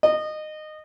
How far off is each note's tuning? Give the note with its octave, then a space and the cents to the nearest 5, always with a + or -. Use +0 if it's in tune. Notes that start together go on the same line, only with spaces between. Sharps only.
D#5 -20